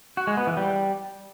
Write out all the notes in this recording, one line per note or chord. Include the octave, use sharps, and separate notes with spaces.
F#4
G#3
B3
E3
G3